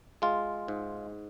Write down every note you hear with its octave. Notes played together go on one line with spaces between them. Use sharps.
G#3 F4
G#2